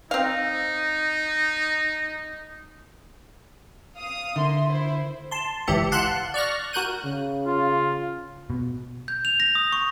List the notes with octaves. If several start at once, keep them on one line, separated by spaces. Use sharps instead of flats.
C4 D#4 F5
F5 D#6
D3 A#4 E5 C6
E4 C5
A5 C6
G1 C#2 E3 G4 E5 C#7
F5 F#5 A5 C6 F#6
D5 C#6 F6 F#6 A#6
F#4 A#4 F#6 G6 D#7
C#3
F4
B2
G6
F7
A#6
D#6
C#6